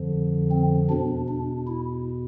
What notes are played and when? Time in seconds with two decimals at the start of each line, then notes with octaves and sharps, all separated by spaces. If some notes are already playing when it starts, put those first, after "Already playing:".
Already playing: F2 D3 F3
0.51 C4
0.90 E2 B2 D4
1.28 D4
1.67 E4